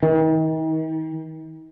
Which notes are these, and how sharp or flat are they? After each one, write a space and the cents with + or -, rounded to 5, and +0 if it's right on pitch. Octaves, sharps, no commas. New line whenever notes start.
D#3 +40